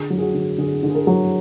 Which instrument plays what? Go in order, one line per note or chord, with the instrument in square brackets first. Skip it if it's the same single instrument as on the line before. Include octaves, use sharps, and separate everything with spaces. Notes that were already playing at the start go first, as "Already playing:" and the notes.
Already playing: [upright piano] D3 G#4
F#3
G#4
F#4
D3
D3 G#4
D3
G#4
A#4
F#3